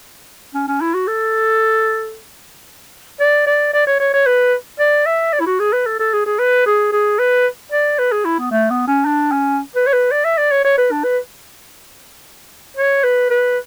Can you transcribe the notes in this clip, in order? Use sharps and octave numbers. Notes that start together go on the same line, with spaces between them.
C#4
C#4
E4
F#4
A4
D5
D5
D5
C#5
C#5
C#5
B4
D5
E5
D5
E4
F#4
G#4
B4
A4
A4
G#4
G#4
B4
G#4
G#4
B4
D5
B4
G#4
E4
B3
A3
B3
C#4
D4
C#4
B4
C#5
B4
D5
E5
D5
C#5
C#5
B4
D4
B4
C#5
B4
B4